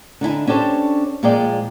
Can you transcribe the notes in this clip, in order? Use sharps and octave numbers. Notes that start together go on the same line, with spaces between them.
D3 D#4 E4 G#5
C#4 D4 G4 A4 C5 C#5
A#2 F3 G#3 G#4 D5 G5